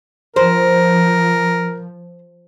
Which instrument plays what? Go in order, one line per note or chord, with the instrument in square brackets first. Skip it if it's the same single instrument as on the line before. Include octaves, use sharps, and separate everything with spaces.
[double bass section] F3 [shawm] A#4 [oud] C5